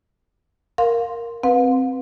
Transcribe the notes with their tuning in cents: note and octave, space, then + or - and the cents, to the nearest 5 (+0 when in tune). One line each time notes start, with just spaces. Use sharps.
A#4 +0 F5 +15 C6 +0
C4 +0 B4 +0 F5 +45